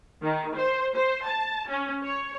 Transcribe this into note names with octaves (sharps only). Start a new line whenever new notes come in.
D#3
C5
C5
A5
C#4
C#5